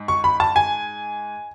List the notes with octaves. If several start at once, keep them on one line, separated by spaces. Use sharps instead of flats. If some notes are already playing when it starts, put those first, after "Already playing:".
Already playing: G#2
C#6
B5
A5
G#5